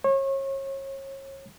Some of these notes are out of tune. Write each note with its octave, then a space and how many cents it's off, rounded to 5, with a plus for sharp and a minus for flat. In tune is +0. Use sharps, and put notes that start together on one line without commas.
C#5 -35